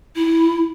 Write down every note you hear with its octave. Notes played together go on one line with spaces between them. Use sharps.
E4